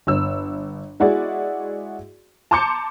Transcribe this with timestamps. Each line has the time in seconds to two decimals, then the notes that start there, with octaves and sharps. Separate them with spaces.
0.07 G1 E6
1.00 G#3 E4 F#4 G#4 D5
2.51 A5 A#5 C6 D6 G6 C#7